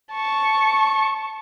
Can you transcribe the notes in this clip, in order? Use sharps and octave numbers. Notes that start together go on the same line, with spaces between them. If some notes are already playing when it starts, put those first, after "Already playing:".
A5 C#6